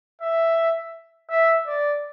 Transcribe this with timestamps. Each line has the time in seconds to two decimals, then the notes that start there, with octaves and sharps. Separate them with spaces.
0.22 E5
1.30 E5
1.67 D5